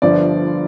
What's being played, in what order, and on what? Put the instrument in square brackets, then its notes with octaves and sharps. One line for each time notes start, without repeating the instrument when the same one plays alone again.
[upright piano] G1 G2 D3 F3 D5